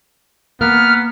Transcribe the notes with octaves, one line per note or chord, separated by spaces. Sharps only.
A#3 B3 F6